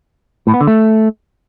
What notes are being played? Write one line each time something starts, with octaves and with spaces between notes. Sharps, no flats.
A2
B3
D3
A3